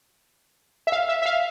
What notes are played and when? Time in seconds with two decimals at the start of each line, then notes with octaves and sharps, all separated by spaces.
0.87 E5
0.92 F5
1.09 E5
1.22 E5
1.26 F5